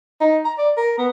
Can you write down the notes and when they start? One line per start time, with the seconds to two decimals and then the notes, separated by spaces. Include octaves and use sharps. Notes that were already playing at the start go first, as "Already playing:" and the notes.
0.21 D#4
0.45 A#5
0.58 D5
0.77 A#4
0.98 B3